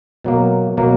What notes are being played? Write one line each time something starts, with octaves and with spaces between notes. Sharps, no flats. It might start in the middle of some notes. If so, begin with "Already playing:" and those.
B2 F#3 A#3
B2 F#3 A#3